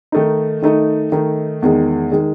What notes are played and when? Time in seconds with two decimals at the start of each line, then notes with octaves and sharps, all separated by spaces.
0.12 D#3 A3 D#4
0.62 D#3 A3 D#4
1.12 D#3 A3 D#4
1.62 E2 D#3 G#3
2.12 D#3 G#3